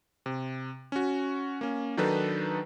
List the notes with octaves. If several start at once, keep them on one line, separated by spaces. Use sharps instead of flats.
C3
C#4 F#4
A#3 C#4
D#3 F#3 D4 D#4 A4 B4